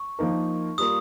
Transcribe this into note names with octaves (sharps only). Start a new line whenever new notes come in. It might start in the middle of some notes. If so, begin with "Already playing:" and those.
Already playing: C#6
F3 A#3 D#4 A#4
G3 A#3 F4 A#4 D#6